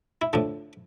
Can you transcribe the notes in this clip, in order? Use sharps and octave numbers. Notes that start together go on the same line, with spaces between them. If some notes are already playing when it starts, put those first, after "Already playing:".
E4
A2 D3 F3 D4